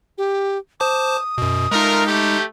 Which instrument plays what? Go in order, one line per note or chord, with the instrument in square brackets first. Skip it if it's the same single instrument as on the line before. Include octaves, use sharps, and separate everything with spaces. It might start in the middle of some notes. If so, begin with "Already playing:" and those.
[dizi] G4
[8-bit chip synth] C5 A5 D6 [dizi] D#6
[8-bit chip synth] F#2 B2
[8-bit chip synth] G#3 D#4 [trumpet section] A3 F4 A#4
[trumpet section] A3 G4